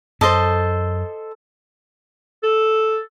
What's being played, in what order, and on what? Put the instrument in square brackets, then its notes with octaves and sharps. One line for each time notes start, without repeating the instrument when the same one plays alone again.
[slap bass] F#2 [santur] A4 [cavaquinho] C5 D#5 A5
[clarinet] A4